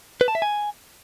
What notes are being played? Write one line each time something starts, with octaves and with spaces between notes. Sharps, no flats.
B4
A5
E5
G#5